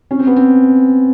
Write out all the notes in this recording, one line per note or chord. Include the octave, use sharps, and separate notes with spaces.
C#4
C4
B3
C4